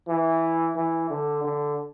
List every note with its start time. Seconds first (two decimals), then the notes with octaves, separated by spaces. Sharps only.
0.08 E3
0.76 E3
1.10 D3
1.44 D3